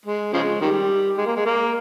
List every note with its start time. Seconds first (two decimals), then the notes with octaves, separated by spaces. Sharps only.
0.06 G#3
0.33 C#3 F3 G#3
0.61 D#3 G3
1.17 G#3
1.26 A#3
1.36 G#3
1.45 A#3